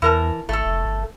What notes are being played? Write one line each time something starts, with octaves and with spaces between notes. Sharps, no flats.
E2 E3 A#4 A5
G#1 A3 A4
F1
G1